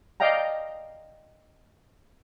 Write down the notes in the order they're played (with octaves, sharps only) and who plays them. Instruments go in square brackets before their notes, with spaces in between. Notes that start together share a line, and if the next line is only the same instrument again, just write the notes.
[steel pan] D5 D#5 F5 G5 A#5